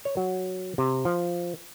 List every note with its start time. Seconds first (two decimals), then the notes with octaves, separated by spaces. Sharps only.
0.05 C#5
0.17 F#3
0.78 C3
1.05 F3